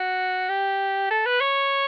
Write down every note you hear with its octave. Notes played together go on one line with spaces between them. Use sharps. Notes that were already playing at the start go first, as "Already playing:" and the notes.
Already playing: F#4
G4
A4
B4
C#5